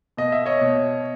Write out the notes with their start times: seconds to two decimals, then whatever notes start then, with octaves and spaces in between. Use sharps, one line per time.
0.17 B2 D#5
0.32 E5
0.46 C#5 D#5
0.61 B2